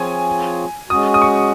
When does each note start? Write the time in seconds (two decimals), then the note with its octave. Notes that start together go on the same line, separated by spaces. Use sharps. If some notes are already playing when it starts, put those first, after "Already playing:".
Already playing: F3 C4 F4 G#4 C#5 G#5
0.90 G#3 C#4 F#4 D#6
1.14 D#6
1.21 C#6